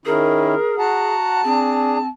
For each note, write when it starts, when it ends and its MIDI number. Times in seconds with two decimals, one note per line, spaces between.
0.06 0.55 51
0.06 0.55 61
0.06 0.55 64
0.06 1.15 68
0.06 0.78 70
0.78 1.41 66
0.78 1.41 78
0.78 2.06 81
0.78 1.41 82
1.44 2.07 60
1.44 1.98 62
1.44 1.98 68